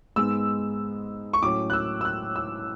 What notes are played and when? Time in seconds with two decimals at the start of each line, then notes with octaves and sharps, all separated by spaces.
0.16 G#2 G#3 B3 E6
1.33 C#6
1.42 A2 F#3 C#4 D6
1.70 F#6
1.73 E6
2.01 E6
2.05 F#6
2.36 E6